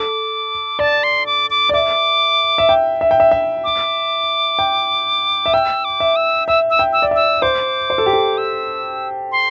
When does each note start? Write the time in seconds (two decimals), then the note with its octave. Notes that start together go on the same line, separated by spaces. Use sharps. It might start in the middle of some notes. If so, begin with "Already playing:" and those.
Already playing: A4 D6
0.79 D5 A5
1.03 C6
1.26 D6
1.50 D6
1.69 D5
1.74 E5 D6
2.58 E5
2.69 G5
3.01 E5
3.11 G5
3.20 E5
3.31 E5
3.64 D6
4.59 G5
5.46 E5
5.54 G5 E6
5.85 D6
6.00 E5
6.16 E6
6.48 E5 E6
6.70 E6
6.79 G5
6.93 E6
7.02 D5
7.11 E5 E6
7.42 C5 D6
7.90 C5
7.98 A4
8.06 G4
8.13 A4
8.38 E6
9.32 C6